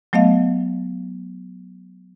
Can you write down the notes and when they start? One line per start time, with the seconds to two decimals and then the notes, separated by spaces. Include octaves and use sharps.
0.13 F#3 A3 B3 D#5 F5